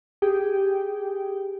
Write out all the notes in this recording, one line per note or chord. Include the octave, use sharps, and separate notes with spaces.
G4 G#4 G5